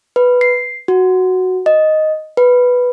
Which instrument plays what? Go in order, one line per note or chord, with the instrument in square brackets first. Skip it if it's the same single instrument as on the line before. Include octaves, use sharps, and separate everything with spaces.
[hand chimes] B4
C7
F#4
D#5
B4